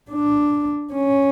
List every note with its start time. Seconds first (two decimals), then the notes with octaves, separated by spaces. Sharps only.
0.11 D4
0.93 C#4